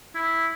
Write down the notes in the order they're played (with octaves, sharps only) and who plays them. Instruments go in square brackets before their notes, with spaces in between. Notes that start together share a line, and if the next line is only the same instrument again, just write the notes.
[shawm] E4